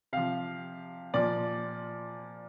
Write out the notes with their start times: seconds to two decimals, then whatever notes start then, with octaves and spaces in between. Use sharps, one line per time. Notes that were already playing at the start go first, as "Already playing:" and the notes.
0.13 C3 F3 F5
1.14 A#2 F3 D5